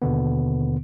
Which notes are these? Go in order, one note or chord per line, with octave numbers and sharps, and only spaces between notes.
D#2 B2 D3 B3